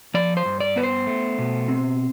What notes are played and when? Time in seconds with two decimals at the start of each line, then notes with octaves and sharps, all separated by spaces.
0.14 F3 D5
0.37 C5
0.45 G2
0.60 D5
0.76 B3 B4
0.83 C5
1.07 A3
1.39 B2
1.68 C4